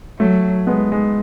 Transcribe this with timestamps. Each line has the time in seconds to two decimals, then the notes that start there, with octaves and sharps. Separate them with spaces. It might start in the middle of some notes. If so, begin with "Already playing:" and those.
0.19 F#3 A3
0.67 G#3 B3
0.92 G#3